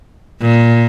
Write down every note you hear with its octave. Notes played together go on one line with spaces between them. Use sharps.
A#2